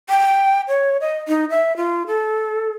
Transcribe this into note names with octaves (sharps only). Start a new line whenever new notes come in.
G5
C#5
D#5
D#4
E5
F4
A4